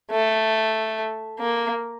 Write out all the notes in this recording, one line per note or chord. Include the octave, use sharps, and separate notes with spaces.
A3
A#3